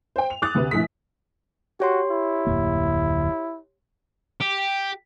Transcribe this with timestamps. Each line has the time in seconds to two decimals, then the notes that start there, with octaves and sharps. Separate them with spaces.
0.16 C5 G5
0.30 F7
0.42 D6 D#6 F#6 A6
0.55 D2 C3 B4
0.71 A#1 E3 A3 B6
1.80 F#4 G4 C#5 C6
2.11 E4
2.47 D1 F2 A#3
4.41 G4